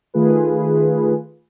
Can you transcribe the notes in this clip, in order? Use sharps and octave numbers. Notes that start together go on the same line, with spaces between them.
D#3 A3 F4 G#4 B4